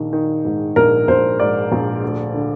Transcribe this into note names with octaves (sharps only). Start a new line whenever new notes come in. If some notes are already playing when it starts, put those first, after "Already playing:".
Already playing: A#1 D#3
D#3
G#2
A#1 A#4
A#1 C5
G#2 D5
A#1
D2
D3